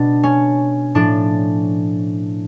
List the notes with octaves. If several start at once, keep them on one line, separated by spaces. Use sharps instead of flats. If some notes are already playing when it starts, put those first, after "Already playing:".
Already playing: B2 D4
C#4
A2 F3 D4